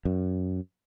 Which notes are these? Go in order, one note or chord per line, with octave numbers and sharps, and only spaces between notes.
F#2